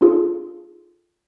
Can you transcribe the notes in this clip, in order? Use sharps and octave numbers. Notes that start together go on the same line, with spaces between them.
D4 D#4 F4 G#4 A4